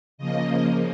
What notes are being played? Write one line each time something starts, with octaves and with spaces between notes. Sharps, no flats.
C#3 F3 A#3 D#5